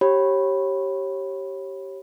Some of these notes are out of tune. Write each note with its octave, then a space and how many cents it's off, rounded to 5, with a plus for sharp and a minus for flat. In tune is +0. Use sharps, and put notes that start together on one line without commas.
G4 -15 C#5 -25 B5 +0